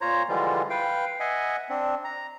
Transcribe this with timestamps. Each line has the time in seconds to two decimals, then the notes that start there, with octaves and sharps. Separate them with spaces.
0.01 A#2 F4 C5 C#5 A#5
0.29 D3 E3 F3 G3 G#3 F4
0.70 B4 F5 G5
1.20 D#5 E5 F#5 G#5
1.69 C4 D4
2.04 A#5